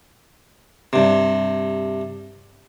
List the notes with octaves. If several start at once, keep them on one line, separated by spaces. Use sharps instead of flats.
G2 C3